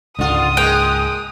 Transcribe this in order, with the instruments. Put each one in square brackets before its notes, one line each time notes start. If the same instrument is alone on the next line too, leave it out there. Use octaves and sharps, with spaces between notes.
[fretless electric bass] C#2 G#2 [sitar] D3 F4 [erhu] D#6
[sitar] G#3 A#3 [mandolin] G5